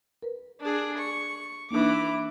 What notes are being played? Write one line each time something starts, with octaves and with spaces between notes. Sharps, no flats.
A#4 B4
D4 G#4
C#6
E3 A#3 D4 D#4 D6